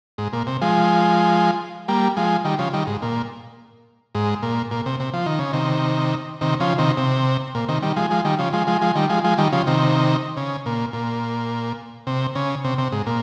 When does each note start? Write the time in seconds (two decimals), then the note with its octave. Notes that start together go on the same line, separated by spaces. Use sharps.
0.18 G#2
0.33 A#2
0.47 C3
0.62 F3 G#3
1.88 G3 A#3
2.17 F3 G#3
2.45 D#3 G3
2.59 C#3 F3
2.73 D#3 G3
2.87 G#2
3.02 A#2
4.15 G#2
4.43 A#2
4.71 A#2
4.86 C3
5.00 C3
5.14 F3
5.26 D#3
5.39 C#3
5.53 C3 D#3
6.41 C3 D#3
6.60 C#3 F3
6.78 C3 D#3
6.97 C3
7.55 A#2
7.68 C3 D#3
7.82 D#3 G3
7.96 F3 G#3
8.10 F3 G#3
8.25 D#3 G3
8.39 C#3 F3
8.53 F3 G#3
8.67 F3 G#3
8.81 F3 G#3
8.95 D#3 G3
9.09 F3 G#3
9.24 F3 G#3
9.38 D#3 G3
9.52 C#3 F3
9.67 C3 D#3
10.37 C#3
10.66 A#2
10.93 A#2
12.07 C3
12.35 C#3
12.64 C3
12.78 C3
12.92 G#2
13.06 A#2